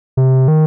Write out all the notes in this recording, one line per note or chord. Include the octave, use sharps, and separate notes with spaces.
C3
D#3